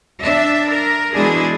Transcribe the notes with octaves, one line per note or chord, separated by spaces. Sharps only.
D4 E5
A#4
B2 E3 G#3 D4 E4 G#4